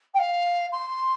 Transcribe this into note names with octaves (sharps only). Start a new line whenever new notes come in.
G5
F5
C6